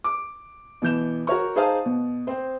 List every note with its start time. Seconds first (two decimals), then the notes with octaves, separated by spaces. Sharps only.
0.04 D6
0.82 B2 E3 G6 E7
1.27 F#4 A#4 C#5 C#6
1.56 D#4 G#4 C5 F5 A5 D#6
1.85 B2
2.27 C4 C5